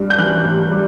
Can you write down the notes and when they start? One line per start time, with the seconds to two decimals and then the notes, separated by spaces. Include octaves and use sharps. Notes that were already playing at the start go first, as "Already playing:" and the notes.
Already playing: G2 G3
0.10 G6
0.18 E3 F#6
0.45 A1
0.71 G3